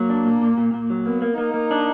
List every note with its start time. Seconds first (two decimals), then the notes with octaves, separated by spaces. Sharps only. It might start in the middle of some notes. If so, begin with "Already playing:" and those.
Already playing: F#3 A#3
0.10 D4
0.25 A#2
0.41 A#2
0.58 A#2
0.74 A#2
0.90 F#3
1.06 A#3 B3
1.22 A#3
1.38 A#3 D#4
1.54 A#3
1.71 D4